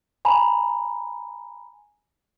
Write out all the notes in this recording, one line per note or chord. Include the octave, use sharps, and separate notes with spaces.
G#5 A#5 B5